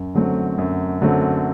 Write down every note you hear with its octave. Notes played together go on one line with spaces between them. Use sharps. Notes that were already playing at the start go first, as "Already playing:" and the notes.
Already playing: F#2
D3 F#3 A3 C4
F#2
D3 F#3 A3 C4